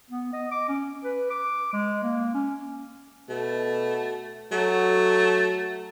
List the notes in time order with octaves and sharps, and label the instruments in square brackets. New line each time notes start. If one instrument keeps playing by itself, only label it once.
[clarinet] B3
D#5
D6
C#4
B4
D6
G#3
A#3
C#4
[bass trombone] B2 [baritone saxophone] A3
[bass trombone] F#3 [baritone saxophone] A3